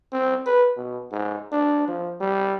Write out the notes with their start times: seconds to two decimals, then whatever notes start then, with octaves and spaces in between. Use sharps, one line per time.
0.12 C4
0.46 B4
0.77 B2
1.11 G#2
1.52 D4
1.88 F3
2.21 G3